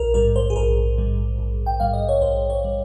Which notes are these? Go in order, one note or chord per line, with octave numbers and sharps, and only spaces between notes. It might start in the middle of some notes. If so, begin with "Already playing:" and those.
Already playing: A#1 A#4
G#2 G3 A#4
C5
G#4
A#1 A#4
G#2 G3
A#1
G5
G#2 G3 F5
D#5
C#5
A#1 C5
C#5
G3